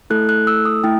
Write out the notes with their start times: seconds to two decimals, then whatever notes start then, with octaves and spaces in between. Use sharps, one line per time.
0.10 A3 E4 A4 F#6
0.29 F#6
0.47 E6
0.65 D#6
0.84 A3 E4 G5